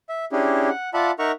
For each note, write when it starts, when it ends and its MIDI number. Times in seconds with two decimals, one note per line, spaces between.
0.09 0.25 76
0.32 0.70 61
0.32 0.70 62
0.32 0.70 64
0.32 0.70 67
0.32 0.70 68
0.70 0.90 78
0.94 1.11 65
0.94 1.11 74
0.94 1.11 76
0.94 1.11 78
0.94 1.11 81
0.94 1.11 83
1.19 1.32 63
1.19 1.32 70
1.19 1.32 76
1.19 1.32 78
1.19 1.32 82
1.19 1.32 85